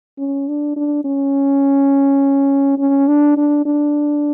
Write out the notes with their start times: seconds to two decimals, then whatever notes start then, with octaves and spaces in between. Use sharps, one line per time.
0.18 C#4
0.48 D4
0.76 D4
1.05 C#4
2.79 C#4
3.08 D4
3.37 D4
3.66 D4